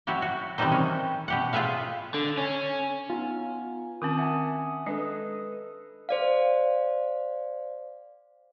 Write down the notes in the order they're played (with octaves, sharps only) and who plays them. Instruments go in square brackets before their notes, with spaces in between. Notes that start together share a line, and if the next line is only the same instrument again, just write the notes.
[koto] F#3 E4 F#4 G4
F#4
C3 D#3 E3 G3 D#4 C5
C#4
B2 G4 F#5
F4 G#4 B4 E5 F5
[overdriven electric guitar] D3
C#4
[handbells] B3 D#4 G#5 [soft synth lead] F4
[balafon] D#3 C4 C#4 [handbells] A5 D6 [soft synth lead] D#6
[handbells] E5 F#5 G#5
[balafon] G#3 D4 [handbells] A4 B4 D#5
[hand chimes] C5 D5 F5